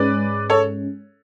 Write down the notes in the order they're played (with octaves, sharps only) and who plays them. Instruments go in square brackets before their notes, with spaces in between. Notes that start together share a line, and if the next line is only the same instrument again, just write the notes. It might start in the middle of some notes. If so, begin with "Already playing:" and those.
Already playing: [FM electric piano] G#2 G#3 C#4 [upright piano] B4 D5
[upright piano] A4 C#5